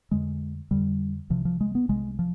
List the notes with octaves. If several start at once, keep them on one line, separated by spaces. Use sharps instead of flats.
F2 D3 G#3
F2 D3 G3
C2 C3 F3
F3
G#3
B3
C2 C3 G#3
F3